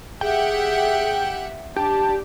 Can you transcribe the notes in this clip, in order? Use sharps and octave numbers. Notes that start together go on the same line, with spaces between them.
G4 G#4 E5 F#5 G5
D4 G4 A5